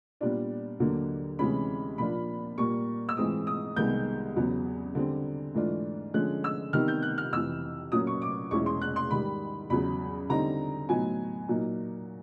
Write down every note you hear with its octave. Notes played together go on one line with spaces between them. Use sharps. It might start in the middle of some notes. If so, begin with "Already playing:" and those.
A#2 G3 B3 D4 F4
D#2 D3 F#3 A#3
D2 C3 E3 G#3 C#4 B5
A#2 F3 A#3 D4 F4 B5
A#2 G3 A#3 C#6
E6
G#2 E3 G#3 C4 F4 D#6
D#6
C2 C3 D#3 G#3 B3 G6
E2 C#3 F#3 B3
D3 G3 C4
G#2 E3 A3 D4 F4
D3 F3 G#3 C#4 F#6
E6
C3 D#3 G3 B3 D#4 F6
G6
F#6
F6
F2 C3 E3 E6
A#2 F#3 A#3 C#4 D#6
C#6
D6
E2 B2 G#3 C#4 E4 C#6
C6
F#6
C6
G#2 D#3 G3 B5
E2 C#3 F#3 B5
D3 G3 C4 D#4 A#5
A2 F#3 B3 D#4 G#5
A#2 F#3 A#3 D#4